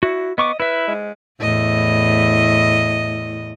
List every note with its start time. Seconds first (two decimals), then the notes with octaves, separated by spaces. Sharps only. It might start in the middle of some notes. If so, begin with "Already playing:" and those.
0.03 E4 F#4
0.38 B3 D#5 C#6 D6
0.60 E4 B4 E5
0.88 G#3
1.40 E2 A2 D#5